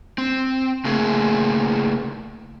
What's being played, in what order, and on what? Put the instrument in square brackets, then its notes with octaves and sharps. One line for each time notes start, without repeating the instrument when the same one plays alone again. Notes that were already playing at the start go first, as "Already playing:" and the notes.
[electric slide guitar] C4
C#3 A3 A#3 G#4